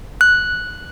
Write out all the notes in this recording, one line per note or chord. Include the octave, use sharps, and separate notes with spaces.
F#6